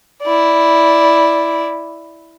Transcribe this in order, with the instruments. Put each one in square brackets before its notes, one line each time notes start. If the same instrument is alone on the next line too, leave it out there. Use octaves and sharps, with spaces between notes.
[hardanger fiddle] E4 D5